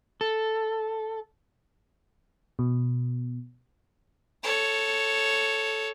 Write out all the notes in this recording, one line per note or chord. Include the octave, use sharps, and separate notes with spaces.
A4
B2
A4 C#5